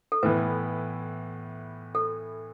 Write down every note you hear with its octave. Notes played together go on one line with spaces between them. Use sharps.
A4
A2 E3 B3 B4
A4